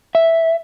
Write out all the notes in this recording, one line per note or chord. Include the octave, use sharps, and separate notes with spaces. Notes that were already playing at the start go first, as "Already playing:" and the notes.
E5